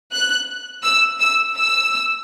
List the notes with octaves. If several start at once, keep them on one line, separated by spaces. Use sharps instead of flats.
F#6
E6
E6
E6